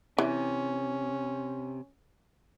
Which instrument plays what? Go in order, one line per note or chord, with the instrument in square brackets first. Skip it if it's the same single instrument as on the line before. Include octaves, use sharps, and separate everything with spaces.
[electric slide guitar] C3 [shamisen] E3 [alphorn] C#4